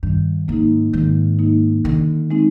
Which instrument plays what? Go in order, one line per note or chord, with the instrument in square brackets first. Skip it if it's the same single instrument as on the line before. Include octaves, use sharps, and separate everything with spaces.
[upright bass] G2 [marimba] D#3
[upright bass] G#2 [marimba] A#3 D#4
[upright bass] G#2 [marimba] D#3
[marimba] A#3 D#4
[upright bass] D3 [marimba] D#3
[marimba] G#3 C4 D#4